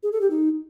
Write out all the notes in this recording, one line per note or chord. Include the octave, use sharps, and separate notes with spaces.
G#4
A4
G4
D#4